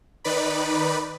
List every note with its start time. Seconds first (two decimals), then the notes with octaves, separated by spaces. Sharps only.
0.24 D#3 D#4 B4 D5 B5